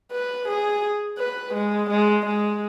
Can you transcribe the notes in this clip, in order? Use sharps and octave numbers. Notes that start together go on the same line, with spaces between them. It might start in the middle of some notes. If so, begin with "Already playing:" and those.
B4
G#4
B4
G#3
G#3
G#3